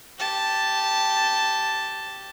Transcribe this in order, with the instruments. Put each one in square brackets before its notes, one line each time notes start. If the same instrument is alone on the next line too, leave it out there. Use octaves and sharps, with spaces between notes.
[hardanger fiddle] G4 A5